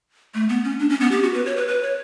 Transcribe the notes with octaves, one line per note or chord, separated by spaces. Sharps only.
A3
B3
C#4
D4
C#4
B3
G4
F#4
B4
C#5
B4
B4
C#5